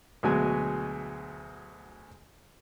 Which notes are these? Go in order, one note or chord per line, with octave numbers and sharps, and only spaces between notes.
D2 B2 F#3 G#3 G#4 G#5